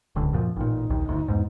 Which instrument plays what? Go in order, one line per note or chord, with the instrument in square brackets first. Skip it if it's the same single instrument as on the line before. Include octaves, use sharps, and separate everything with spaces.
[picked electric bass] D1 C#2 D3
F#2 A#2 F3
[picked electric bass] A1 A#2 [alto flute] D#4
[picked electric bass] A#1 D#2
G1 D2
E2 G#2